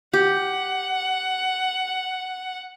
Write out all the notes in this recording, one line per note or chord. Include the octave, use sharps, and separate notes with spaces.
G4 F#5